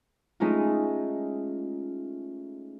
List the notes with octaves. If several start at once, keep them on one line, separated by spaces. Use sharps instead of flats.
G#3 A3 C#4 D#4 F4